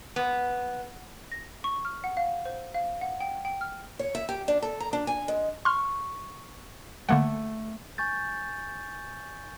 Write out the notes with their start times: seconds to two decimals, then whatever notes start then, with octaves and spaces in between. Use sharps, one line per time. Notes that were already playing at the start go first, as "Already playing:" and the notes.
0.16 B3
1.32 A#6
1.64 C#6
1.85 F6
2.04 F#5
2.17 F5
2.45 C5
2.74 F5
3.01 F#5
3.20 G5
3.45 G5
3.61 F6
3.99 C#5
4.15 E5
4.29 G4
4.48 D4
4.62 A4
4.80 A#5
4.93 D4
5.07 G#5
5.28 G#3
5.65 C6 C#6 F6
7.09 D3 A3 A#3 F#5
7.98 G#5 C#6 G6 A6